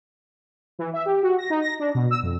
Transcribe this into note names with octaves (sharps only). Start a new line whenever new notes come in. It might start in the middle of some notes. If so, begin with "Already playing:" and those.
E3
E5
G4
F#4
A#6
D#4
A#6
D4
B2
E6
F2